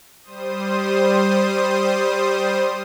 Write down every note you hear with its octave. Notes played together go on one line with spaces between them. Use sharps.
G3 C5 D#6